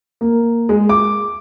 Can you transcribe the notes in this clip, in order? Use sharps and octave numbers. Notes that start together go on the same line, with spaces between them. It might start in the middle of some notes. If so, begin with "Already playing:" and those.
A#3
G#3
D6